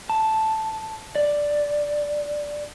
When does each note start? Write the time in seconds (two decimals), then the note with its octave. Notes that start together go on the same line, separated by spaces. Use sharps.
0.10 A5
1.15 D5